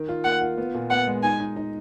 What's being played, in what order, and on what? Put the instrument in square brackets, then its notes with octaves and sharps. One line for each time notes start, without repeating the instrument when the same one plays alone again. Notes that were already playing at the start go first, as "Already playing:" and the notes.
Already playing: [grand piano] D#3
F4
[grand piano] A#3 [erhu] F#5
[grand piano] F4
B3
A#2
[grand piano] B3 [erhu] F#5
[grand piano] G#3
[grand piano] D#4 [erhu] G#5
[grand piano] D#4
D#4